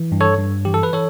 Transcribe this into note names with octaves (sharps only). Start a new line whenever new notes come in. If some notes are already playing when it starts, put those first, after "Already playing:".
Already playing: E3
G2
A4 C#5
G2
E3 G4
A4
B4
E3 A4 C#5